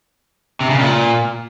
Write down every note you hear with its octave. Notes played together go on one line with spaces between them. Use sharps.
C3
C#3
A#2